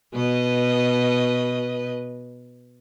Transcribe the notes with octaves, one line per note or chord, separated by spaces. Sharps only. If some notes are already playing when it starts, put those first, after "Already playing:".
B2 B4 D#5